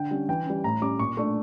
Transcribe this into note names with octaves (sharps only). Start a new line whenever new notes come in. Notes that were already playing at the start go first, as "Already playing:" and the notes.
Already playing: D3 G5
G3 C#4
E3 G5
G3 C#4
A2 A#5
G3 C#4 D6
A#2 C#6
A3 D4 C#6